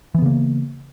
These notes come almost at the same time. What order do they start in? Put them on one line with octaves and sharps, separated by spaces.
E3 B3 C#3 A#3